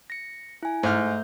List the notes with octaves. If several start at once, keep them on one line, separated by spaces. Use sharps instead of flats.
A#6 C#7
E4 G#5
G#2 A3 E5 F6 G6